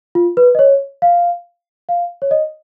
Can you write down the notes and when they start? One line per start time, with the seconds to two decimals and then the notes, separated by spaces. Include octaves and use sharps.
0.15 F4
0.37 B4
0.55 D#5
0.59 C#5
1.02 F5
1.89 F5
2.22 C#5
2.31 D#5